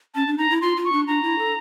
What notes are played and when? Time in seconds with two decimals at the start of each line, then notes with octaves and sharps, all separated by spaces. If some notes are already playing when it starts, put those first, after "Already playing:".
0.14 C#4 A5
0.27 D4
0.38 D#4 A#5
0.50 E4
0.61 F4 C6
0.77 F4
0.85 C#6
0.92 D4
1.07 D4 A#5
1.23 E4
1.38 A4